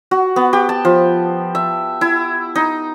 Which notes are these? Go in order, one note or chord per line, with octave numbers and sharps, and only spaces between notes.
F#4
B3
G4
A5
F3
E5
E4
D#4